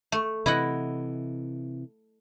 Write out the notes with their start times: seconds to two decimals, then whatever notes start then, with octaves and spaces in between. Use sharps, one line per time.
0.12 A3
0.46 C3 E3 E4 D#5 F#5